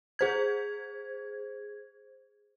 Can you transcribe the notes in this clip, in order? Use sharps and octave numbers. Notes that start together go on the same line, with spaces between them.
G#4 C5 G#6